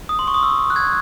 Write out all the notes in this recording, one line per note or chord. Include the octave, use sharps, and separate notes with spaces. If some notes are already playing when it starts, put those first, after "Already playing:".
D#6
C6
C#6
D#6
E6
F#6
G#6